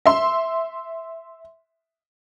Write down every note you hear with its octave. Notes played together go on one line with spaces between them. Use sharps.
E5 C6